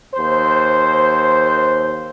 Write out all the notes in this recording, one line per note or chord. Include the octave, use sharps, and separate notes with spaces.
D#2 C5